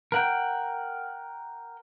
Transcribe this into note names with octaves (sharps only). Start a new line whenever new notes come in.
A#4 F#5 G5